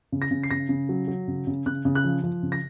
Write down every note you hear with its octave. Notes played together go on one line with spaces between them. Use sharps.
C#3
A#6
C#3
C7
C#3 A#6
C#3
F#3
F#3
C#3
C#3
C#3 F#6
C#3
F#6
F3
F3
C#3
A#6